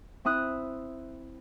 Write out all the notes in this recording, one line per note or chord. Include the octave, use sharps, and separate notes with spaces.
C4 E4 D#6 F#6